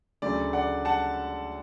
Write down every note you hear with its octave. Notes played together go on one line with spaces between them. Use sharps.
D2 C#3 F#3 A3 D5
D5 F#5
F#5 A5